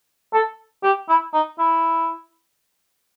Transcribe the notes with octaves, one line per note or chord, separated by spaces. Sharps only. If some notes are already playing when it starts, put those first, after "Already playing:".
A4
G4
E4
D#4
E4